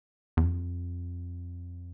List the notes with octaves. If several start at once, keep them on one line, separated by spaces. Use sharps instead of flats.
E2
F2